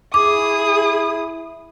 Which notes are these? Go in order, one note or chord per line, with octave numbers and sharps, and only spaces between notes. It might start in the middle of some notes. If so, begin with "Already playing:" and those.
E4 G#4 D6 D#6